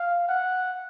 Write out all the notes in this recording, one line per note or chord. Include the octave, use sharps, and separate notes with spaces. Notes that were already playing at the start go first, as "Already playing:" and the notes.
Already playing: F5
F#5